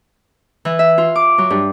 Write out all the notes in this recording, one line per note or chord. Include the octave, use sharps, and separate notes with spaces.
E3
E5
F4
D6
F#3
G2